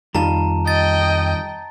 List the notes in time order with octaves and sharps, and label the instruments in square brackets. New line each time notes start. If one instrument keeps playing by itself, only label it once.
[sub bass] F2 [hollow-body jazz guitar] D#3 G3 F4 [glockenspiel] A5 A#5
[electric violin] D#5 G5 [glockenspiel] A6